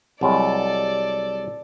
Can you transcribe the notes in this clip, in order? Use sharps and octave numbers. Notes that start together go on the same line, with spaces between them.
C2 F#3 G#3 A4 D5